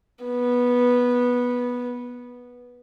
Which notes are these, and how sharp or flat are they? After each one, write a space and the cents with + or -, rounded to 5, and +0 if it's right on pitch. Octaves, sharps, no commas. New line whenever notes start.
B3 -10